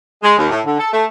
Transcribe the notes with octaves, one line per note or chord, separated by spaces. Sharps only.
G#3
D#2
A2
D3
A4
A3